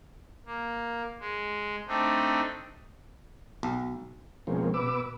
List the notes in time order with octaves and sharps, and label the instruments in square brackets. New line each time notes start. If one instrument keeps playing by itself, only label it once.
[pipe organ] A#3
G#3
A3 C4 D4 D#4
[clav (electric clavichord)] B1
[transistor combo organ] B2 F3 G#3 A#3 C4 C#4
B2 B4 D6 E6